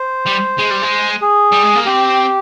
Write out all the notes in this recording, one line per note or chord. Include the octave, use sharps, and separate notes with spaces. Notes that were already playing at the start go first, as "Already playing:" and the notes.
Already playing: C5
G3
G#3
G3
G#3
G#4
G3
G#3
A#3
C4 G4